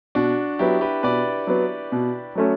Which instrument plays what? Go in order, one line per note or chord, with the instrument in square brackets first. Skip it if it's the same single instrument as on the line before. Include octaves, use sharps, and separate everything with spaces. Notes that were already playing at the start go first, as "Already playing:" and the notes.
[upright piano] B2 [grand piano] D4 F#4
[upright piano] F#3 B3 [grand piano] E4 G4
[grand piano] G4 B4
[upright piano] B2 [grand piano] B4 D5
[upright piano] F#3 B3
B2
F#3 A3 C#4